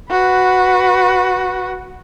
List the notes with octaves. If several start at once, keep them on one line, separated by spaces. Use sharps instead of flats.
F#4 B4